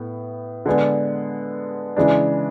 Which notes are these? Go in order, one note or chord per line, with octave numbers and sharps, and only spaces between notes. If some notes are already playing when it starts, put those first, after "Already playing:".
Already playing: A2 B3
D3 G#3 B3
C#3 E3 G#3 D4